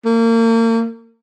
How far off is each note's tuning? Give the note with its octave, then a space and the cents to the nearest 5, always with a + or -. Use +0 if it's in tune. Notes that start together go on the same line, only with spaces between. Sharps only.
A#3 -35